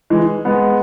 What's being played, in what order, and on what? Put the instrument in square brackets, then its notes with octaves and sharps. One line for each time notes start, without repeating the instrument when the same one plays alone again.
[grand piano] E3 G#3
G#3 B3